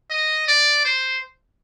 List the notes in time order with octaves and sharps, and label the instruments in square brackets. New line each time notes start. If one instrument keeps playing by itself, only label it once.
[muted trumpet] D#5
D5
C5